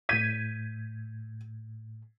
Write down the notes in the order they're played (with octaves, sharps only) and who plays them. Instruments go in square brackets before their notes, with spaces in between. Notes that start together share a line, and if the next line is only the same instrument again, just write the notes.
[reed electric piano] A2 G6 [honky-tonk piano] G#6 B6 D#7